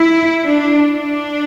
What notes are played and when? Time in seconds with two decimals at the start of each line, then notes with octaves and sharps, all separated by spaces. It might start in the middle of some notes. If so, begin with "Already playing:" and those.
Already playing: E4
0.44 D4
0.93 D4